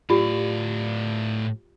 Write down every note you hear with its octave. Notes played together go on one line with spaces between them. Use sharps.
A2 F4 G4 D5